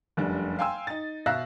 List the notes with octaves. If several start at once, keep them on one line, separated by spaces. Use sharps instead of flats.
F1 F#2 G3 D4
F5 G5 G#5 C6 E6
D#4 A6
B2 E5 F5 E6 F#6 A#6